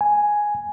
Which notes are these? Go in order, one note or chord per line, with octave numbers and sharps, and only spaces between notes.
G#5